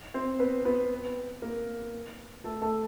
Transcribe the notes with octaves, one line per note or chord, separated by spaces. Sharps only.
C4 C5
B3 B4
B3 B4
A#3 A#4
A3 A4
A3 A4